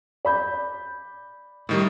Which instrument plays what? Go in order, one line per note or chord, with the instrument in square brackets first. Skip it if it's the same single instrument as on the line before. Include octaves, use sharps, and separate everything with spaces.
[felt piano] D5 B5 G6
[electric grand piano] A2 D#3 G3